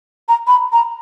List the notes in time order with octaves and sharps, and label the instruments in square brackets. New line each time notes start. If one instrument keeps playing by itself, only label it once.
[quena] A#5
B5
A#5